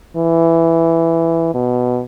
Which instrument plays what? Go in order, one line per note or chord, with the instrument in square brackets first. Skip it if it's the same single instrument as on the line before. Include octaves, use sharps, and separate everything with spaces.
[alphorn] E3
B2